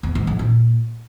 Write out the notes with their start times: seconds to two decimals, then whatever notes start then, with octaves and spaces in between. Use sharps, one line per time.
0.03 E2
0.15 G#2
0.27 F2
0.39 A#2